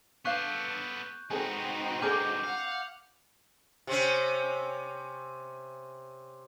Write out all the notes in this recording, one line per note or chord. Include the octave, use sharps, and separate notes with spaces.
B3 D4 A4 B4 F5 C#6 F#6 G6
G#3 B3 C4 D#4 F#4 G#4 A4
B2 G#3 D4 G#4 A4 D6 F6 G6
F5 F#5
C3 C4 C#4